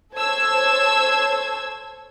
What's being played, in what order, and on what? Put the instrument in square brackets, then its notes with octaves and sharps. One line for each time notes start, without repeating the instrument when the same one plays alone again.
[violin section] A4 C5 C#5 A5 E6 G#6